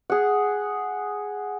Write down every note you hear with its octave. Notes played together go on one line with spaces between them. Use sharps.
G#4 F#5